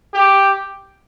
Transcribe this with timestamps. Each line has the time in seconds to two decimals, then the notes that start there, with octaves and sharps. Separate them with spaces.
0.14 G4